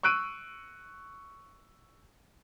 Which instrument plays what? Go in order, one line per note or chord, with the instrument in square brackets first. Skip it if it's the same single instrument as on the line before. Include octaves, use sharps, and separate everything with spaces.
[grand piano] C#6 E6 F#6 D7 D#7